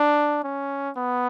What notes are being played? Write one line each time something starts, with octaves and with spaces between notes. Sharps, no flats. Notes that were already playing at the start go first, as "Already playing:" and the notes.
Already playing: D4
C#4
B3